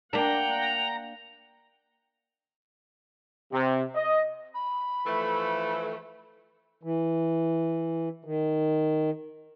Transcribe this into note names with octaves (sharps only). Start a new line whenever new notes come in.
A#3 D4 F#5 G5 A#5
C3
D#5
B5
E3 F3 A3
E3
D#3